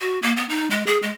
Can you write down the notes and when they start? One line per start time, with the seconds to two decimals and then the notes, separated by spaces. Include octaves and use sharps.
0.01 F#4
0.22 A#3
0.37 B3
0.49 D#4
0.70 G#3
0.87 G#4
1.02 G#3